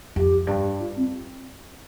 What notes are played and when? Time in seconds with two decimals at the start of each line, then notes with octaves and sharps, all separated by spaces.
0.16 F2 G4
0.47 G2
0.79 F4
0.96 C4